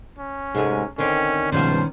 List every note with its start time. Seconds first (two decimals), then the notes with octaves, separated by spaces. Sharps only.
0.19 C#4
0.55 G#2 C3 G#3 A3
0.98 D3 D#3 C4 C#4
1.52 C#2 G2 B2 D#3 F3 C#4 C5